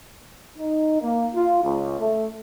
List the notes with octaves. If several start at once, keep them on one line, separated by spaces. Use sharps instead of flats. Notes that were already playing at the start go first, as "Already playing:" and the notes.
D#4
A#3
F4
C#2
A3